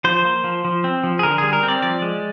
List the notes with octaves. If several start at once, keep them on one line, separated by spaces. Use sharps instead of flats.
F3 C5
A#3
F3
F3
C4
F3
G#4
D3 A#4
G3 G#4
A#4
C4
D5
F3 D5
G#3